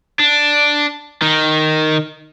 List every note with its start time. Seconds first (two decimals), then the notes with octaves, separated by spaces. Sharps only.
0.19 D4
1.22 D#3